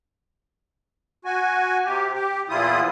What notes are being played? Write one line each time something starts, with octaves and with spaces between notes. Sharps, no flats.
F#4 G#5
C3 G4
G4
E2 A#2 F3 E4 F4 D#6